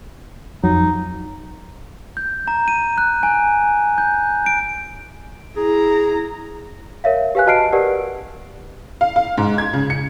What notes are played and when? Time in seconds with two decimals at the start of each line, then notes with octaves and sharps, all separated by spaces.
0.64 F2 F#3 D#4
2.17 G6
2.48 A#5
2.68 D#7
2.98 F#6
3.23 G#5
3.98 G6
4.46 D7
5.57 E4 G#4 A#5
7.04 A#4 C#5 E5 F5
7.35 G4 B4 F5 G#5 F#6
7.46 F#4 D#5 A5 F6 C7 D7
7.72 G4 A#4 B4 D5 F#5
9.01 F5
9.16 F5
9.38 G#2
9.58 G#6
9.73 C#3
9.90 C#7